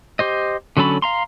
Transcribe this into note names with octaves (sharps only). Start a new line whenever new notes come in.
G4 C5 D#5
D3 F#3 C#4 A4 B5
F5 A#5 C6